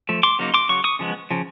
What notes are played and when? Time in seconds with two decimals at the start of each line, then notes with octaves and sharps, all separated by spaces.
0.09 F3 A3
0.23 C6 D6
0.39 C#3 F#3 A#3 D#4
0.54 C6 D6
0.69 C#3 F#3 C#6
0.84 C#6 D#6
0.99 C#3 F3 G#3 B3
1.31 C#3 F3